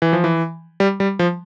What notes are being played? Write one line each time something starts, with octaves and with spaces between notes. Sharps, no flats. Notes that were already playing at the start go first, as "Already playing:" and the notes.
E3
F3
E3
G3
G3
F3